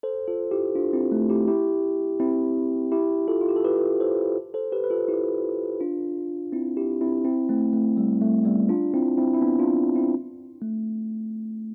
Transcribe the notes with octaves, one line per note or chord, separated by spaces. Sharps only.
A4 C5
F4 A4
E4 G4
D4 F4
C4 E4
A3
E4 G4
E4 G4
C4 E4
E4 G4
F4 A4
F4
G4
A4
G4 B4
A4 C5
A4 C5
G4 B4
B4
F4 A4
E4 G4
D4 F4
C4 E4
E4 G4
C4 E4
C4 E4
A3 C4
A3
G3
A3
G3 B3
D4 F4
C4 E4
C4 E4
E4
B3 D4
D4 F4
C4 E4
A3